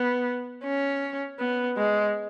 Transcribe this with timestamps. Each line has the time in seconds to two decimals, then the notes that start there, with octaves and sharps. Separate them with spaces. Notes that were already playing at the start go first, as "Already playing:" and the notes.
Already playing: B3
0.64 C#4
1.40 B3
1.78 G#3